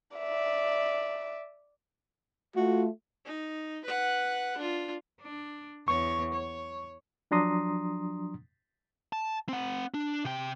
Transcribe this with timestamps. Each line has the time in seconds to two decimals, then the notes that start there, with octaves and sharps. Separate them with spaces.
0.17 D5 E5
2.56 A3 F4 F#4
3.25 D#4
3.85 B4 F#5
4.57 D4 F4
5.21 D4
5.88 E2 C#5 C#6
6.33 C#5
7.31 F3 F#3 D4 A#5 C6 D#6
9.13 A5
9.49 C4 F#5
9.94 D4
10.25 C3 G5